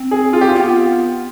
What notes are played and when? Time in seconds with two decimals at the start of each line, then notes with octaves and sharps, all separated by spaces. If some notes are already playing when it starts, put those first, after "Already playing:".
Already playing: C4
0.11 G#4
0.33 F4
0.41 G4
0.49 F4
0.55 B3